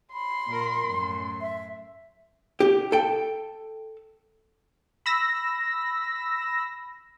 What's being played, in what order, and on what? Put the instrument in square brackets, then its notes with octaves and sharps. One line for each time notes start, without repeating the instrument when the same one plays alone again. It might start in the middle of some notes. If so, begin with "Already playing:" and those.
[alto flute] B5 [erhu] C6
[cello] A#2 A#4
F#2 A2
[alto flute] E5
[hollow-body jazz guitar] G4
A4 G5
[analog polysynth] B5 E6 A#6